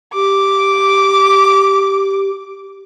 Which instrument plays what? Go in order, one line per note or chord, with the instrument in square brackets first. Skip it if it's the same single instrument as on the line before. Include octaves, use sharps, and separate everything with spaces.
[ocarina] G4 [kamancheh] D6